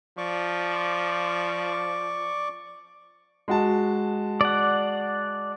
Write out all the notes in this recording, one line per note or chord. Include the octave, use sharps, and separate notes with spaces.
F3 D5 C#6 D6
G#3 F#4 A5
D5 F#5